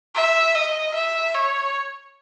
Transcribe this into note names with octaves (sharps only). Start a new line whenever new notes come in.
E5
D#5
E5
C#5